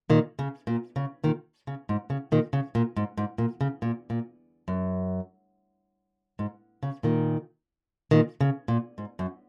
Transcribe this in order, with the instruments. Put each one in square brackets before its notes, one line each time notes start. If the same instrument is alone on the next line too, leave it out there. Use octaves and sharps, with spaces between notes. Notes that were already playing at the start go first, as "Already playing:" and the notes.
[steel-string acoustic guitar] A#2 D#3
C#3
A#2
C#3
A#2 D#3
C#3
G#2
C#3
A#2 D#3
C#3
A#2
G#2
G#2
A#2
C#3
A#2
A#2
F#2
G#2
C#3
A#2 D#3
A#2 D#3
C#3
A#2
G#2
F#2